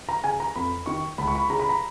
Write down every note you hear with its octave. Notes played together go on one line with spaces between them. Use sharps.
A#5
C#3 G#5
A#5
F2 B5
D#3 C#6
C#2 B5
C#6
B5
C#3 A#5
B5
A#5